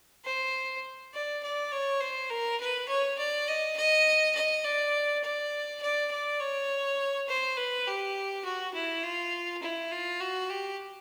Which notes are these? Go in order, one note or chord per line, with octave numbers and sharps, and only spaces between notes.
C5
D5
D5
C#5
C5
A#4
B4
C#5
D5
D#5
D#5
D#5
D5
D5
D5
D5
C#5
C5
B4
G4
F#4
E4
F4
E4
F4
F#4
G4